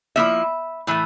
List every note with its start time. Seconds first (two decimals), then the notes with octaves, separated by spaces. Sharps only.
0.16 F3 A#3 E4 E5
0.87 A2 E3 A3